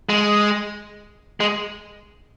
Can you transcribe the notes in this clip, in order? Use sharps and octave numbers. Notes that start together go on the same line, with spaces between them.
G#3
G#3